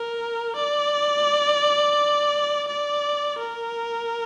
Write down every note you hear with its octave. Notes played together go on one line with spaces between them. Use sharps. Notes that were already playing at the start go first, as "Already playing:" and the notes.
Already playing: A#4
D5
D5
A#4